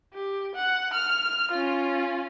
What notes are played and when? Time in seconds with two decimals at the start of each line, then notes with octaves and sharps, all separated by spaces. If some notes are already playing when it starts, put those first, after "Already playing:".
0.14 G4
0.55 F#5
0.93 F6
1.51 C#4 F4